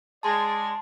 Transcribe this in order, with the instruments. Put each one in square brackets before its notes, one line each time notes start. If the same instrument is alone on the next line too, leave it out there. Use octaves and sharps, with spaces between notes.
[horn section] G#3 G#4 D5 [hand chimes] A5 C6